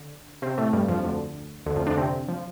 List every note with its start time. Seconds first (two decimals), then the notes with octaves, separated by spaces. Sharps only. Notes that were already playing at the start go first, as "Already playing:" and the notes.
Already playing: D3
0.42 C3 C4
0.58 A2 A3
0.73 G2 G3
0.89 F2 F3
1.04 D2 D3
1.66 D2 D3
1.76 F2 F3
1.87 D3 D4
1.97 C3 C4
2.28 F3